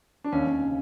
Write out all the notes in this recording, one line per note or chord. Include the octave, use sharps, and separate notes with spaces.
D4
D#2 C#4
D#2
C#3